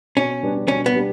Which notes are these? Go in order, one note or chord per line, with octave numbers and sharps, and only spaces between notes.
B2 C#4
G3 D4 G4 B4
B2 C#4
B3
G3 D4 G4 B4